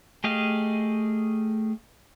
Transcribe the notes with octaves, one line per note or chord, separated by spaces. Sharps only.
A3 G4 G#4 D#5 F5